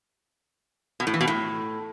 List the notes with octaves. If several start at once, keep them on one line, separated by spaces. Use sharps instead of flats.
B2
A2
E3
B2
A2